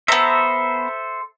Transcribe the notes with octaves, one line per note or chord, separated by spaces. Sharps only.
B3 A4 C5 E5 A#5